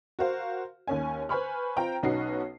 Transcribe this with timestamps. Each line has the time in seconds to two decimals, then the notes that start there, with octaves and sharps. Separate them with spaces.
0.19 F#4 A#4 C5 F5
0.88 D#2 C#4 G#5
1.29 B4 C5 G#5 B5 C#6 F6
1.77 C4 F4 C5 G5 A#5
2.03 B1 C#4 D#4 F#4 B4 C7